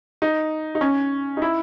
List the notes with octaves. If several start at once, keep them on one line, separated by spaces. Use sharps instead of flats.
D#4
D#4
C#4
D#4
E4